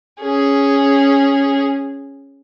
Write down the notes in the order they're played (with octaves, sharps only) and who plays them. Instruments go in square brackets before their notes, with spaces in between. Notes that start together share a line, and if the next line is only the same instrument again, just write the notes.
[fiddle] C#4 G#4